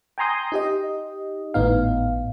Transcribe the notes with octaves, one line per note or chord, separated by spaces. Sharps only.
G5 G#5 A#5 C6 D#6 G6
D#4 G4 D#5
G#1 A2 B3 D#4 F5